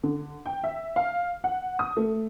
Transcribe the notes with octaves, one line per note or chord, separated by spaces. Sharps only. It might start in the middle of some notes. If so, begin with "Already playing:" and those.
D3
G5
E5
F5
F#5
D#6
A3